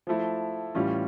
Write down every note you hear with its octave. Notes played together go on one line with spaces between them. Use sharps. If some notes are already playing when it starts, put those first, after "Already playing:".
F3 A3 E4
A2 E3 G3 C#4 F4